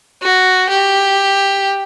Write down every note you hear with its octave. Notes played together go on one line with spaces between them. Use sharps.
F#4
G4